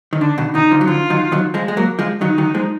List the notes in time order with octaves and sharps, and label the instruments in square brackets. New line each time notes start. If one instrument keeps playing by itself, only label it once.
[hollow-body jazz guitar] D#3
[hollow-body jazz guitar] D3 [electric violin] D4
[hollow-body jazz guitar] B2 D#3
[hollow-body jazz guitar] B2 D#3 [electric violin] D#4
[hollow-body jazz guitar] D3 F3
F#3
[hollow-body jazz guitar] D3 F3 [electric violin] F4
[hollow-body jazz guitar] D#3 F#3
D#3 F#3
F3 G#3
G#3
F#3 A#3
F3 G#3
[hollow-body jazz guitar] D#3 F#3 [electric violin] D#4
[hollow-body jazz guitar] D#3 F#3
F3 G#3